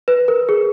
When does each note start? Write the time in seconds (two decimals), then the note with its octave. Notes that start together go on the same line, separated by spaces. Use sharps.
0.08 B4
0.28 A#4
0.49 G#4